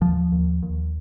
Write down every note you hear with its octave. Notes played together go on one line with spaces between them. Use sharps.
D#2 F3
D#2
D#2